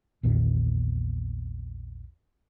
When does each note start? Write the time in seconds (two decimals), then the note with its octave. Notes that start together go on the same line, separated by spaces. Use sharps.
0.23 A#1 E2 A#2 D#3